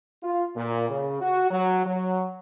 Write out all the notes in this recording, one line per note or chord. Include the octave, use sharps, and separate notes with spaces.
F4
A#2
C#3
F#4
F#3
F#3